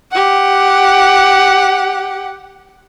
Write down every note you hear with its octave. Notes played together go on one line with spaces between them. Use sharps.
G4 F#5